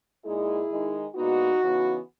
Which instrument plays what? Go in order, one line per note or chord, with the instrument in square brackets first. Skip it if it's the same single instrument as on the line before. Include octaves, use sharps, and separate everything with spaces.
[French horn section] A#2 G#3 D#4 E4 G#4
D#3 G#3 D#4
A#2 G#3 B3 D#4 F#4
C#3 E3 B3 D#4